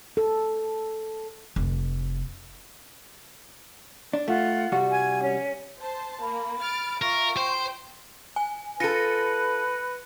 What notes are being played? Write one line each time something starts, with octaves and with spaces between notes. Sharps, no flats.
A4
F1
D4
A3 F4 F#5
C2 G3 F#4
G#5 G#6
C#4
C5 A5
A#3 B5
F6 A6 D7
F4 A#4 E5 C#6
C5 G5 C6
G#5
F4 A4 B4 A#6 C#7 D#7